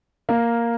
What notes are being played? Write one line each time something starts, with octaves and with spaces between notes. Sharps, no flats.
A#3